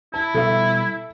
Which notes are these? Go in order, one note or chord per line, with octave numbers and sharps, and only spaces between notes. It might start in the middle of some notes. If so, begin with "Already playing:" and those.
E4 A5
B2 G3 A4 E5